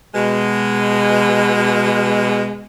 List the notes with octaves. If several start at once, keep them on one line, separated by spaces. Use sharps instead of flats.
B2 G#3